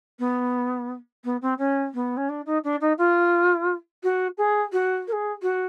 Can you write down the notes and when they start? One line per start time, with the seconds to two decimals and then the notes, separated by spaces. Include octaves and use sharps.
0.19 B3
1.24 B3
1.42 C4
1.58 C#4
1.94 B3
2.17 C#4
2.29 D4
2.46 D#4
2.64 D4
2.81 D#4
2.98 F4
4.03 F#4
4.38 G#4
4.72 F#4
5.08 A#4
5.12 G#4
5.42 F#4